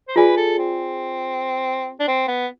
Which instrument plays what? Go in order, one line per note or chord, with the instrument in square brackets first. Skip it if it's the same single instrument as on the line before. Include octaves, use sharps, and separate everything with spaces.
[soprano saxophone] C5
[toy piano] F4 G#4 D5 G#5 [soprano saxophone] B4
[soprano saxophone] A4
C4
D4
C4
B3